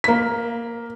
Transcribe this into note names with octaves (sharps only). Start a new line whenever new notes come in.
A#3 B6